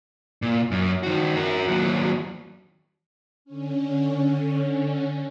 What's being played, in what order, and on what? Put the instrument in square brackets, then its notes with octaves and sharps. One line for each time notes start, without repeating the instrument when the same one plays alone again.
[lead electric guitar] A#2
F#2
D#3 F#4
F#4 A#4
D#2 F#3
[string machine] D3 C#4